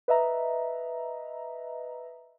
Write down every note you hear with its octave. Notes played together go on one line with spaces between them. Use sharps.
B4 D#5 E5 A#5